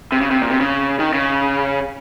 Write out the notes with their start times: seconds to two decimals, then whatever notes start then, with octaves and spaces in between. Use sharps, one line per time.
0.12 C3
0.22 C#3
0.31 C3
0.42 A#2
0.51 C3
0.61 C#3
0.99 D#3
1.13 C#3